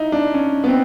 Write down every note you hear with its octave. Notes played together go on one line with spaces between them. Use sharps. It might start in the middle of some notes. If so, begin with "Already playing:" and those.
Already playing: D#4 E4
D4
C#4
B3
C4